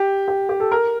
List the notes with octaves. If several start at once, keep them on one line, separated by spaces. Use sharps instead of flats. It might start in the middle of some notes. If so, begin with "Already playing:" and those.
Already playing: G4
G4
G4
A4
A#4